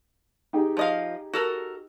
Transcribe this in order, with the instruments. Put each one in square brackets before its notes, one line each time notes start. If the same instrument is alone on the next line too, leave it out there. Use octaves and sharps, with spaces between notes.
[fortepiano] D#4 G4 G#4
[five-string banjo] F3 D#5 F5
F#4 A4 A#4